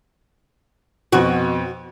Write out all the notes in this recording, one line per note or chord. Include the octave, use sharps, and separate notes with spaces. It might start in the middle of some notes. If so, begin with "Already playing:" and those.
F2 B2 F#4